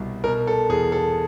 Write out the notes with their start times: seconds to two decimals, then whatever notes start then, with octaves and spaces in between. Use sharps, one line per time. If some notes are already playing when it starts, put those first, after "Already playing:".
Already playing: C2 B2
0.24 B2 A#4
0.47 A4
0.69 E2 G#4
0.92 A4